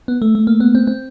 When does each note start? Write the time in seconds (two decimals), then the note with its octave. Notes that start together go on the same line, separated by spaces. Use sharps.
0.08 B3
0.22 A3
0.35 A3
0.47 A#3
0.60 B3
0.75 C4
0.87 C4